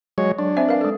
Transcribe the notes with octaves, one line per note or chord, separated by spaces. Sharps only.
F#3 G#3 C#5
F#3 D4
C4 C5 E5
A#4 B4 F5
G#3 A4